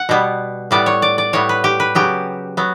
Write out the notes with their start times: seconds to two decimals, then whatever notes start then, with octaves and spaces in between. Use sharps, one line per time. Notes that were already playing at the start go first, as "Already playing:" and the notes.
Already playing: F#5
0.09 B2 G3 B3
0.71 A2 G3 B3 D5
0.86 C#5
1.02 D5
1.18 D5
1.33 A2 G3 B3 C#5
1.49 B4
1.64 G4
1.80 B4
1.95 C#3 F#3 B3 G4
2.57 F#3 B3